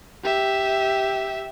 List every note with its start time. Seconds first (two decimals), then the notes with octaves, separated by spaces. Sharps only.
0.24 G4 E5